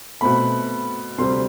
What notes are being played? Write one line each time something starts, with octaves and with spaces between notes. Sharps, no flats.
B2 A3 C4 B5
D2 C3 G3 C4 C6